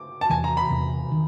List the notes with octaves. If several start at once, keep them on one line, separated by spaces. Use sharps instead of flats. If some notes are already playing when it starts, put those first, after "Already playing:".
Already playing: D6
A5
E2 C3 E3 G#5
A#5
B5
E2 C3 E3
D#3